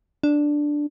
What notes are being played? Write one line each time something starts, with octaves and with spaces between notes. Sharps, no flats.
D4